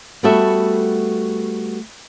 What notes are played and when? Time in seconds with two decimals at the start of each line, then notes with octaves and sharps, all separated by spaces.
0.23 G3 A3 B3 F#4 A4 E5